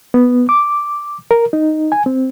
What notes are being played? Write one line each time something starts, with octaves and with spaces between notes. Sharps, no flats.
B3
D6
A#4
D#4
G#5
C4